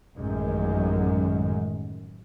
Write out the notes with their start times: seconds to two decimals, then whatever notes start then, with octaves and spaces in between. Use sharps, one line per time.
0.17 A1 F#2 D#3 G#3